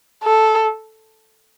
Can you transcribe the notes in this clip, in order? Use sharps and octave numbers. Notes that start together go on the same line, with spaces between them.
A4